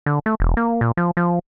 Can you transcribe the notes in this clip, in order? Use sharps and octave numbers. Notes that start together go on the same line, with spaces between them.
D3
A3
E1
A#3
A#2
F3
F3